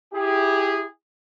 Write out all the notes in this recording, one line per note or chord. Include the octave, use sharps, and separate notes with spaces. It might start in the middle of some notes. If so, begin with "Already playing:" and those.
E4 G4 G#4